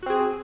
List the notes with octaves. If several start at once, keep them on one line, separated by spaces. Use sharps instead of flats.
C4 F#4 G#4